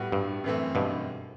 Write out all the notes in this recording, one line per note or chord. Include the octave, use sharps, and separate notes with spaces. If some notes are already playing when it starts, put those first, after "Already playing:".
Already playing: A2 G3 B3 F#4
G2
F#2 E3 A3 C4
G2 B2